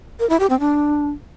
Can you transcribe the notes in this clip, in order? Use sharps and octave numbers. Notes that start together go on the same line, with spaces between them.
A#4
E4
G4
C4
D4